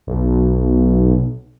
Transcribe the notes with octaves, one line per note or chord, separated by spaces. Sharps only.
B1